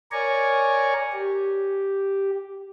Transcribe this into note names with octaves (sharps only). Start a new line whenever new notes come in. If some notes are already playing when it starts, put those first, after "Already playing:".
A#4 C#5 D5 G#5 A#5 C#6
G4